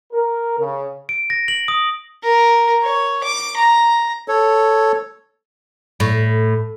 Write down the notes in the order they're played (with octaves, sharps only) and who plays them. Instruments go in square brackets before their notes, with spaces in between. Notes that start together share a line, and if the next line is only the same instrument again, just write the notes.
[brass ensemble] A#4
C#3
[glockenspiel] D7
A#6
F#7
D#6
[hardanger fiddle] A#4
C#5
D6
A#5
[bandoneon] A4 C#5
[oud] A2